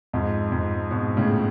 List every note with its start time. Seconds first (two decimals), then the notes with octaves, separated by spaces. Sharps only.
0.13 F2 G#2
0.52 F2 G#2
0.91 G#2 B2
1.16 A2 C#3